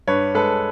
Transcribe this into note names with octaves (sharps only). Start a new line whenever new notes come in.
G2 B4 C#5
G#3 A4 B4